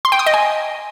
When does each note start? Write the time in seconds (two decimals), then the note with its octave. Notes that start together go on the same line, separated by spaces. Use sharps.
0.05 C6
0.12 G5
0.19 D#6
0.26 D#5
0.34 G#5